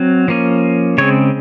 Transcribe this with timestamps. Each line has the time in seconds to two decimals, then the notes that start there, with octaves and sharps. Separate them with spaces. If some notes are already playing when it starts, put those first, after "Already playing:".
Already playing: F#3 C4
0.28 F3 A#3 C#4
0.98 C#3 G#3 C4 C#5